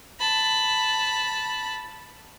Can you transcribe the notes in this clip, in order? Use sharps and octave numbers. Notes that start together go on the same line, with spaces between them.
A5 B5